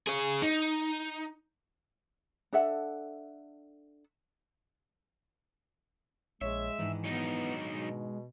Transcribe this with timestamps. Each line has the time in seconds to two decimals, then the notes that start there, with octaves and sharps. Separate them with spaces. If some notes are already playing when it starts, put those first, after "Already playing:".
0.07 G#4 C#5
0.42 D#4
2.53 D4 A4 E5 F#5
6.41 A#1 G#3 C#5 E5
6.79 G#2 D#3 E3 D4
7.04 F#3 B3 D#4
7.74 B2 G#3